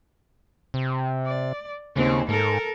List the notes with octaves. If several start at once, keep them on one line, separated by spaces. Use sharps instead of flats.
C3
D5
D#2 C#3 C4
G#2 A4 A#4